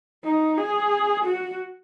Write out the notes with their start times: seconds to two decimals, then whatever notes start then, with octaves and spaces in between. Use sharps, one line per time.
0.24 D#4
0.58 G#4
1.25 F#4